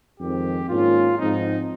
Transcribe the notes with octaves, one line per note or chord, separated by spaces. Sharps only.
F2 D#3 G#3 C4 G4
G#2 D#3 A#3 C#4 F4
G#2 F3 C4 D#4